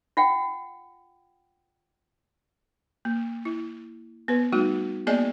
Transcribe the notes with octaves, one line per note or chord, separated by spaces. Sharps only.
F4 F#5 G5
A#3
E4
B3 B4
G3 A3 D#4 F#4
A#3 B3 G#4 D5 D#5 G#5